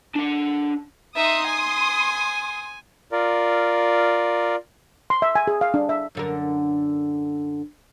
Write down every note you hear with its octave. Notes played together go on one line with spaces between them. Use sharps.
D4 F#5
D#4 E5 C6 D#6
G#5
F4 A#4 D5
C6
E5
G#5
G#4
F5
D4
E5
F#2 D3 A#4